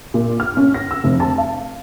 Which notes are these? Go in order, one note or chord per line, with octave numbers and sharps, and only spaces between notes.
A#2
F6
C#4
A#6
E6
F1
A5
F5